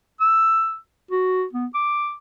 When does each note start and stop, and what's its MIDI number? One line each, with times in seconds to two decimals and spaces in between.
0.21 0.76 88
1.11 1.44 66
1.53 1.66 59
1.74 2.14 86